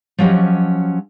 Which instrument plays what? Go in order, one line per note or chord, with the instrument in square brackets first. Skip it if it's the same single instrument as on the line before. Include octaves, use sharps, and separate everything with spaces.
[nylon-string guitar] F3 F#3 C#4 G4 D#5